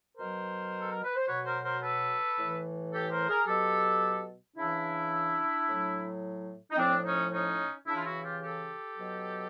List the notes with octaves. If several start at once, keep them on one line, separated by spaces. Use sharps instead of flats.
B2 F#3 A#4 C5
A4
A#4
B4
C5
B2 F#3 B4 C#5
A#4 C5
A#4 C5
A4 B4
A2 E3
G4 A4
A#4 C5
G#4 A#4
B2 F#3 G4 A4
C#3 E3 D4 E4
A2 F#3
D#4
A2 F3 C4 D4
C#4 D#4
C#4 D#4
C#3 E3 D4 E4
F4
E4 F#4
F4 G4
G4 A4
B2 F#3